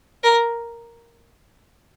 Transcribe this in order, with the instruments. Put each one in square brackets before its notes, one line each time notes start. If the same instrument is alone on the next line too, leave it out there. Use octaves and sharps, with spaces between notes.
[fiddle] A#4